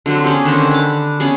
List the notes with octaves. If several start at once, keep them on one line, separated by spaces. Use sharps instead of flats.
D3 F#3 C4
B3 C#4 G4 G#4
D3 D#3 C4 C#4
B5 D6
C#3 B3 C#4 G#4